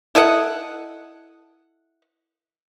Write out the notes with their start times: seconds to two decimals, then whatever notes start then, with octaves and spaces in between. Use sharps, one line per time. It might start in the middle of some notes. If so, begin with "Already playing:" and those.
0.15 E4 A4 D#5 F#5